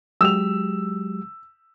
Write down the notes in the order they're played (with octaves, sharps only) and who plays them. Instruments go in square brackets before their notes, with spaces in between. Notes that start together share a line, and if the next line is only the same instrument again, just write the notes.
[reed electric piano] F#3 G#3 G4 [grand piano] E6 F7